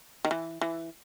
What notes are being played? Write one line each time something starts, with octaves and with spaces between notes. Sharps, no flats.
D#3
E3
E3